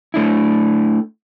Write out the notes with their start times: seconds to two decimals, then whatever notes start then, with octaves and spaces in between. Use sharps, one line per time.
0.14 A3 D4 E4